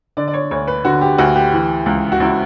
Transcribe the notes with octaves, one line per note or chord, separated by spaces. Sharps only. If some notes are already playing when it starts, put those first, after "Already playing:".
D3 D5
D5
C#5
D2 C#5
B4
D3 F#4
G4
D2 F#4
G4
E3
C#2
F#4
C#2 E4